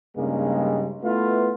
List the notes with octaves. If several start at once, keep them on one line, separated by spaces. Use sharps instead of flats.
G2 C#3 G3 G#3 A#3 D#4
A3 B3 E4 F4 B4